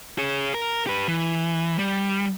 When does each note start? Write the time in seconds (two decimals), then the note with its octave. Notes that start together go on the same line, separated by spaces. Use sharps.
0.18 G#4 C#5
0.54 A#4
0.87 G4 B4
1.08 E3
1.79 G3